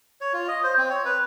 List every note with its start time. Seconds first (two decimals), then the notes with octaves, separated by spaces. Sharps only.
0.21 C#5
0.33 F4
0.48 D#5
0.64 C5
0.78 C4
0.90 C#5
1.05 B4